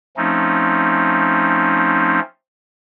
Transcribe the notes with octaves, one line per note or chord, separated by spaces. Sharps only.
F3 A3 C4 C#4 D#4